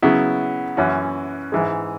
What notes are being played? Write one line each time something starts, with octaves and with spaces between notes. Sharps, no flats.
C#3 F#3 B3 E4
F#2 E3 C#4 F#4
G#2 E3 G#3